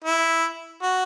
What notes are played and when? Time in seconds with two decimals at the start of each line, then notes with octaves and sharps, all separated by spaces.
0.05 E4
0.82 F#4